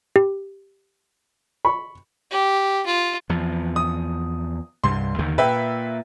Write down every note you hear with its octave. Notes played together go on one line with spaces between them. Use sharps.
G4
B5 C#6
G4
F4
E2 F3
D#6
C2 G2 C6
D#2 D3 D#3
A#2 B4 E5 G5